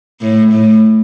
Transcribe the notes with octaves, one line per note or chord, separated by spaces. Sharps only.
A2
A2